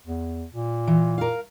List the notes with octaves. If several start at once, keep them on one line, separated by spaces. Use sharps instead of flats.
E2
A#2
E3
A#4 F5